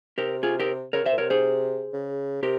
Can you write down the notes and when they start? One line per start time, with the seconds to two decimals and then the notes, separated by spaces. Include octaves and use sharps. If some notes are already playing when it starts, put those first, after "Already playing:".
0.18 C3 G4 A#4
0.43 F4 G#4
0.60 G4 A#4
0.93 C#3 A#4 C#5
1.02 C3 C5 E5
1.12 A#2
1.18 C3 A#4 C#5
1.30 G#4 C5
1.93 C#3
2.43 C3 G4 A#4